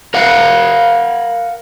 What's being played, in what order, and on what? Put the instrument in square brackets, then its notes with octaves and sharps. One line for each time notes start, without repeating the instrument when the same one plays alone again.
[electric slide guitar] A#4 F5 F#5